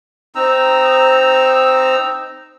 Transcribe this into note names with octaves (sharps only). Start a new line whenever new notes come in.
C4 D#4 A#5 E6